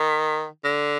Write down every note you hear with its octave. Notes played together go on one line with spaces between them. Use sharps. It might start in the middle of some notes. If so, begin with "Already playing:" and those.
Already playing: D#3
D3